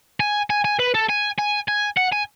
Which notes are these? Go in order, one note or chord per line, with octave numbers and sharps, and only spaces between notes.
G#5
G#5
G#5
B4
A4
G#5
G#5
G#5
F#5
G#5